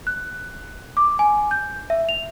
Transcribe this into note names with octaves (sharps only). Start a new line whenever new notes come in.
F#6
D6
G#5
G6
E5
F7